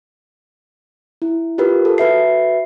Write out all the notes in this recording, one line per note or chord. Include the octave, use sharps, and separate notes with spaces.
E4
F4 G4 A#4 B4
A4
F#4 B4 E5 C7